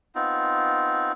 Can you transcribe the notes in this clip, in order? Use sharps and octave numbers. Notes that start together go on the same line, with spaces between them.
B3 C4 D#4 F4